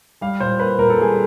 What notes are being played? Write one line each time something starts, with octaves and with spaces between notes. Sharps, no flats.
G3 F5
A#2 C5
A#3 B4
A#2 A#4
A4
G3 G#4